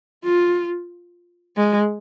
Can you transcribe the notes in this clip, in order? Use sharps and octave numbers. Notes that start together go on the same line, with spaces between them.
F4
G#3